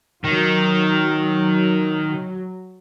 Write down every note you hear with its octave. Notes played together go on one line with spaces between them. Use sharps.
D#3 F#3